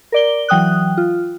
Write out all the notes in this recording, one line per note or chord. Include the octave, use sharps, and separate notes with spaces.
A#4 D5 G7
E3 F#3 G5 D#6 F#6
F4